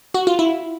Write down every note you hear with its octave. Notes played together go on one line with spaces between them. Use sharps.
F#4
F4
E4